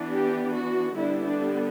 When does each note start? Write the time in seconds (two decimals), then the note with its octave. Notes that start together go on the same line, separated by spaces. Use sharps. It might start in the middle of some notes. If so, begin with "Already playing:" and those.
Already playing: E3 B3 D4
0.11 G4
0.53 F#4
0.96 D3 G3 B3 D4 E4
1.24 D4